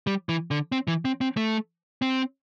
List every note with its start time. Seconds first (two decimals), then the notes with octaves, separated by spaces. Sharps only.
0.07 G3
0.29 E3
0.51 D3
0.72 C4
0.88 E3
1.05 C4
1.21 C4
1.37 A3
2.02 C4